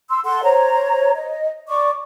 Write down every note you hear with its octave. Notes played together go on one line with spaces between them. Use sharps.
C6 E6
A4 F#5 C6
C5 C#5 A#5
D#5
D5 C#6 D6